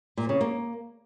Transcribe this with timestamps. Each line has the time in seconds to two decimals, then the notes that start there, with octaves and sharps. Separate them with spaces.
0.17 A#2
0.29 C#3
0.41 A#3